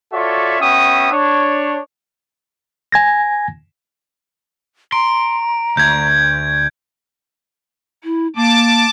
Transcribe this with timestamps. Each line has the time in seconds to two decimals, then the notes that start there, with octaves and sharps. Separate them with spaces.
0.13 F4 F#4 A4 C#5 D5 E5
0.61 B3 C#4 F#4 E5 G5 D#6
1.11 D4 C#5
2.92 G#5 G#6 A#6
4.92 A#5 C6 D7
5.77 D2 G6 G#6
8.04 E4
8.36 A#3 A5 D6